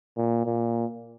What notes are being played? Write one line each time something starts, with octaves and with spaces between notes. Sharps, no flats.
A#2
A#2